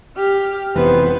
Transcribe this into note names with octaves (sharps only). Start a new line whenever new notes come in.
G4 F6
F1 E3 B3 B4 C5